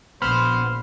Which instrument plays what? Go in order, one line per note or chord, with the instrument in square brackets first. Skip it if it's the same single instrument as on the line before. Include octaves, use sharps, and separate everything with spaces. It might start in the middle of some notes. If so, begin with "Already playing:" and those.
[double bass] A#1 A#2 [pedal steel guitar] B3 C6 [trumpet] C5 [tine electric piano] B5 F6